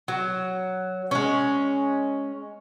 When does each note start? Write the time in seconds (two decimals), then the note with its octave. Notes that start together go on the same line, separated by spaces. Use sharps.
0.08 F#3
1.11 G#3 C#4